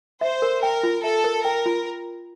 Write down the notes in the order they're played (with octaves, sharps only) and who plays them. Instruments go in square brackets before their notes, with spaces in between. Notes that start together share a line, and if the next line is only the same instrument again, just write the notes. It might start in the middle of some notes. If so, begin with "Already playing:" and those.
[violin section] C5 [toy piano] E5
[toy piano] A#4
[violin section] A#4 [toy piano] G5
[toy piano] F4
[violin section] A4 [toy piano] E5
[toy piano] A#4
[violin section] A#4 [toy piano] G5
[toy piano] F4